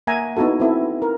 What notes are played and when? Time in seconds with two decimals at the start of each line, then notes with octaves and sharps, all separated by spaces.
0.07 A#3 E5 F#5 G#5 A#5
0.37 B3 D#4 E4 F#4 A4
0.60 C4 E4 A4
1.02 A#4